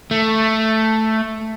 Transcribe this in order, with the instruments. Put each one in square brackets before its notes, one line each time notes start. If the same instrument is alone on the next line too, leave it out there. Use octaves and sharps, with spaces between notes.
[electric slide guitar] A3